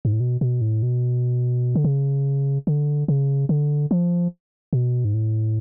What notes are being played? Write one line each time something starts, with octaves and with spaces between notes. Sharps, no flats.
G#2
A2
B2
B2
A2
B2
D3
C#3
D3
C#3
D3
F3
B2
G#2
A2